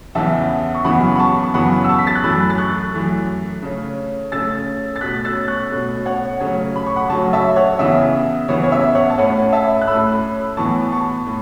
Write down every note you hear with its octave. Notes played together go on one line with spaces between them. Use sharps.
E2 C#3 E3 B3 E5 A5
C#6
F#2 C#3 E3 B3 F#5 B5
B5
A5 C#6
C#6
F#2 C#3 E3 B3 F#5 B5
E6
A5 C#6
B6
A6
F#6
F#2 E3 A3 B5 E6
A6
C#6 F#6
F#2 E3 A3
C#3 A3 C#4
C#3 A3 C#4 E6 A6
A6
B2 A3 C#4 F#6 B6
E6 A6
C#6 F#6
B2 A3 C#4
C#5 F#5
C#3 F#3 A3 C#4 C#5
B5
C#6
F#5 B5
C#3 F#3 A3 C#4 A5 C#6
E5 A5
C#5 F#5
C#3 E3 B3 E5
C#3 E3 B3 C#5
C#5
E5
C#5 F#5
A5
A2 A3 C#4 C#5 F#5
E5 A5
F#6
A2 A3 C#4 B5 E6
A2 E3 B3 A5 C#6
A5 C#6
A2